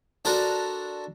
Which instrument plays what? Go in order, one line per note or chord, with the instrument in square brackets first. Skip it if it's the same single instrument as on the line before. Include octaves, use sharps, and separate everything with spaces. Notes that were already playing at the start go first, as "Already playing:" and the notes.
[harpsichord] D4 F#4 A4 A#4 C5 A#5